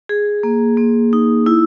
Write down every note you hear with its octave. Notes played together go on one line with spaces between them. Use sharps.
G#4
A#3
A#3
D#4
E4